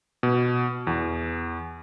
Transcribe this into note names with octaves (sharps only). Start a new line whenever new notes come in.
B2
E2